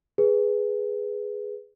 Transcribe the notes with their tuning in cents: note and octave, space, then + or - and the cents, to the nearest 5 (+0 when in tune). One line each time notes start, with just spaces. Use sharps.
G#4 +0 B4 +0